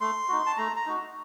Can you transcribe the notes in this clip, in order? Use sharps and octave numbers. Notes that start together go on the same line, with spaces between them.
A3 C6
D#4 F#4
A5
A3 A#5
A#5
D#4 F#4